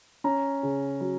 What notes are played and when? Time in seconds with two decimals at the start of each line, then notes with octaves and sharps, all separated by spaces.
0.24 C#4 A#5
0.63 C#3
1.01 F#3